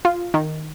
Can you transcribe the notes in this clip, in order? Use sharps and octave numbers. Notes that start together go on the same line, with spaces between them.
F4
D#3